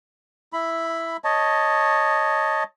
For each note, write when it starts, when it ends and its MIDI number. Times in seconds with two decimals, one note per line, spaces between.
0.53 1.17 64
0.53 1.17 83
1.24 2.63 73
1.24 2.63 75
1.24 2.63 81